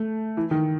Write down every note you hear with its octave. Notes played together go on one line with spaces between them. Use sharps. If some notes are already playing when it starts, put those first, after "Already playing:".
Already playing: A3
E3
D#3